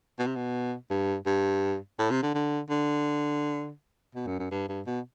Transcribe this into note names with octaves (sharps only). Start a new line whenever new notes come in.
B2
C3
B2
G2
G2
A2
C3
D3
D3
D3
B2
F#2
F#2
G2
G2
B2